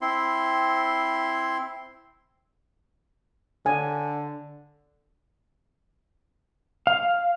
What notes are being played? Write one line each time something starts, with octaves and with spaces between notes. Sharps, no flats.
C4 E4 C6
D3 G#5
F5